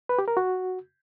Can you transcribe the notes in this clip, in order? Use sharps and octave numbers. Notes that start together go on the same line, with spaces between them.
B4
G4
A#4
F#4